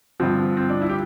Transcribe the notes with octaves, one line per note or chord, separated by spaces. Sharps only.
G2 D3 F3 C4
C4
D4
E4
G4